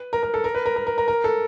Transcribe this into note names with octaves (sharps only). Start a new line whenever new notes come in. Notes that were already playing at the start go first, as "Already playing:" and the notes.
Already playing: B4
A#4
A#4
A4
A#4
B4
A#4
A#4
A#4
A#4
A#4
A4